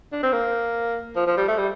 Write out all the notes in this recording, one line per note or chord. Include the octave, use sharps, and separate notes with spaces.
D4
C4
A#3
F3
F3
G3
A3
G3